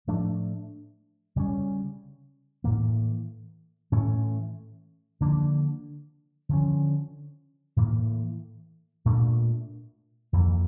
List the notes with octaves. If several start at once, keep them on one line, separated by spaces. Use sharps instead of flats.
A2 F3 A3 D4
C#3 G3 C#4
A2 E3 A#3
A2 E3 A3 C#4
D3 F3 A#3 D4
D3 F3 C#4
A2 E3 A#3
A#2 A3 D4
F2 E3 A#3